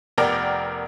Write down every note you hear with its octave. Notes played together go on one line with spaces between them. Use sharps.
F1 B3 A#4 D5 G5 F6